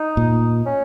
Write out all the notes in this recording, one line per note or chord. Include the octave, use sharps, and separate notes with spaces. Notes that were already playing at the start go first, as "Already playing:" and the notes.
Already playing: D#4
A#2
C#4